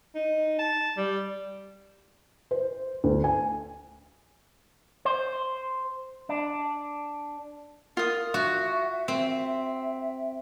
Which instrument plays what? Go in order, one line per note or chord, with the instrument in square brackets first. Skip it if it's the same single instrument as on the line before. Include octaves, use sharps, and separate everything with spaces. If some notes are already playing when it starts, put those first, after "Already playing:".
[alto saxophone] D#4
A5
G3
[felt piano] C5
D2
G#5
[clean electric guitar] C5
D4
[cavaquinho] F4 D#6 [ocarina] A#4
[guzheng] F#4 [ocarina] E5
[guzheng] C4